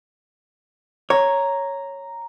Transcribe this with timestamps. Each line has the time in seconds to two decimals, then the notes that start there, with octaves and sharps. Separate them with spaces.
1.10 C#5 A#5